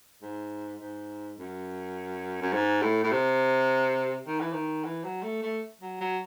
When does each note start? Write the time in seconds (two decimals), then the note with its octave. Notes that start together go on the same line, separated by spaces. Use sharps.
0.22 G#2
0.80 G#2
1.37 F#2
2.41 F#2
2.53 G#2
2.82 A2
3.04 A2
3.12 C3
4.27 D#3
4.40 E3
4.53 D#3
4.85 E3
5.04 F#3
5.23 A3
5.42 A3
5.81 F#3
6.01 F#3